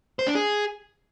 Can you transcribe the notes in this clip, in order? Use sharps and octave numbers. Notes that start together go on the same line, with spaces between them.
C5
D4
G#4